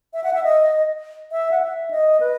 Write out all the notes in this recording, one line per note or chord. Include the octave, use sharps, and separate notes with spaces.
E5
F#5
E5
D#5
E5
F#5
E5
D#5
B4